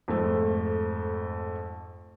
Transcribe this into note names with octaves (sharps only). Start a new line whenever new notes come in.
F2 G#2 A3